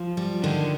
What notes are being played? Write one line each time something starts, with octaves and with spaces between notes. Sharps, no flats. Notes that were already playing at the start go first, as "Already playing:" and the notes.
Already playing: F3
G3
D3 D#3